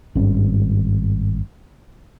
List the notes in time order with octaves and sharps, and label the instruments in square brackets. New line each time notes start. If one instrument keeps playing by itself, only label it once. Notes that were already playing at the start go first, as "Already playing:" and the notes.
[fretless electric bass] G#1 G2 C#4